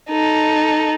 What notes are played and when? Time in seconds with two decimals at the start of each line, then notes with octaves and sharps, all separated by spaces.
0.10 D#4 A4